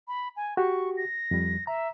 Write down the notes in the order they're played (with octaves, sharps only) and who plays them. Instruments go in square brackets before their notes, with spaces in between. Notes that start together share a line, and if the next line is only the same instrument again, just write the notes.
[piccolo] B5
G#5
[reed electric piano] F#4 G4 [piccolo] C#6
[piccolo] A#6
[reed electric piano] F2 G3
[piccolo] E5 [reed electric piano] A#5